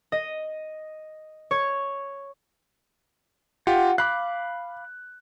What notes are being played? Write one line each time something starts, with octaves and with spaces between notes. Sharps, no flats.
D#5
C#5
F4 G4 F#5
F5 B5 D6 F#6